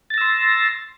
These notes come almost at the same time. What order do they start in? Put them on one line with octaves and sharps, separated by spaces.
A6 A#6 E6 C6